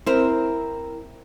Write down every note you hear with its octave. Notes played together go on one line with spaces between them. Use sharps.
C4 E4 A#4